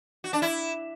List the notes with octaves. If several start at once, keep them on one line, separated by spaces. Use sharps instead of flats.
F#4
D4
E4